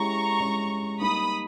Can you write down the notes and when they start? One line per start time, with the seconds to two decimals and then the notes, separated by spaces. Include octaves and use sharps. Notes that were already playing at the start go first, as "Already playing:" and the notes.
Already playing: G#3 C#4 E4 G4 A#5 C#6
0.39 G#3 C#4 E4 G4
1.01 G3 A#3 D#4 B5 D#6